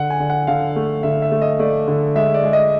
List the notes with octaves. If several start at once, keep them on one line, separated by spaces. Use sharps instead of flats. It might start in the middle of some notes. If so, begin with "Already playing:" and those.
Already playing: D3 F#5
G#5
D3
F#5
D3 F5
A3
D3 E5
E5
A3
D#5
A3 D5
D3
G#3 E5
D5
G#3
D#5